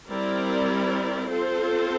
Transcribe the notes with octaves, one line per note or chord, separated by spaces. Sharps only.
G3 C4 E4 A#4 D5
C4 F4 A4 C5